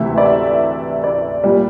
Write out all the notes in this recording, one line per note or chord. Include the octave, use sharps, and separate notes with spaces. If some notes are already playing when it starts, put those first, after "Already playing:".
Already playing: D2 C3 E3 A3 E5
D5
E5
D5
A#2 G3